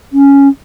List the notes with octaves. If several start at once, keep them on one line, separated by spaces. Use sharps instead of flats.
C#4